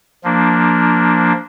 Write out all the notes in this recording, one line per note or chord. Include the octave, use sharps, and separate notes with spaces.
F3 A#3 D4